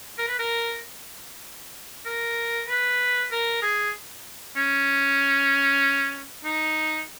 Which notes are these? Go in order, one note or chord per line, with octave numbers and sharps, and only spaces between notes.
A#4
B4
A#4
A#4
B4
A#4
G#4
C#4
D#4